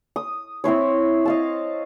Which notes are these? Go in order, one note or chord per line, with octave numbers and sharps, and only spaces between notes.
D#6
C4 E4 C5 C#5
D#5 F5 A5